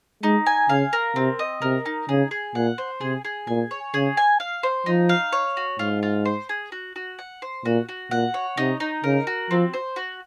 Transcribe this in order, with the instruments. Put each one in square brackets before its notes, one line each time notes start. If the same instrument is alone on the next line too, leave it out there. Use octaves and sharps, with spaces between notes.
[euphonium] G#3 [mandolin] D#4
[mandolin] G#5
[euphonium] C#3 [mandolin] F5
[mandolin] A#4
[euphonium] C3 [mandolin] C4
[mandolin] D#5
[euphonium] C3 [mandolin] A#4
[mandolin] D#4
[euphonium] C#3 [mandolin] G#4
[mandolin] G#4
[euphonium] A#2 [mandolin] F#5
[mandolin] C5
[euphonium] C3 [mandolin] G#4
[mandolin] G#4
[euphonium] A#2 [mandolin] G#5
[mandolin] C#5
[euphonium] C#3 [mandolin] G#4
[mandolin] G#5
F5
C5
[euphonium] F3 [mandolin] D#4
[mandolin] F5
C#5
F#4
[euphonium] G#2 [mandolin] F4
[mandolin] F4
C5
G#4
F#4
F#4
F#5
C5
[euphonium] A#2 [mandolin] F#4
[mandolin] F#4
[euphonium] A#2 [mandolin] F#5
[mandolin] C#5
[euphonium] C3 [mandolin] D#4
[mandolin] D#4
[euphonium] C#3 [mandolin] A#4
[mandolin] F#4
[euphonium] F3 [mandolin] C4
[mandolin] C5
F#4